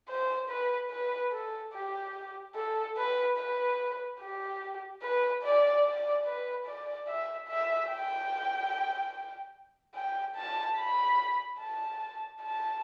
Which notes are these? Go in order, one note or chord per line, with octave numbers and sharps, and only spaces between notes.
C5
B4
B4
A4
G4
A4
B4
B4
G4
B4
D5
D5
B4
D5
E5
E5
G5
G5
A5
B5
A5
A5